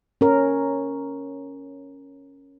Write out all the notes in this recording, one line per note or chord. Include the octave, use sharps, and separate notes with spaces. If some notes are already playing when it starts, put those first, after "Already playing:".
C#4 A#4